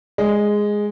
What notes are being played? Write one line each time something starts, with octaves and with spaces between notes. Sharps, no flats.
G#3